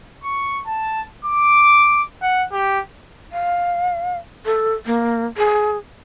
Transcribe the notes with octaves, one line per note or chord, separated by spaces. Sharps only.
C#6
A5
D6
F#5
G4
F5
A4
A#3
G#4